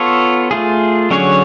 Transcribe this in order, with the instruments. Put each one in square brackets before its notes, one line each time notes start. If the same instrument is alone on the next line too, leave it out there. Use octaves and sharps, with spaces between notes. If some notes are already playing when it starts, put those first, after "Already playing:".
Already playing: [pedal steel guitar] B3 F4 A4 C#5
A3 F4 G#4
D3 F#3 C#4 G#4 C#5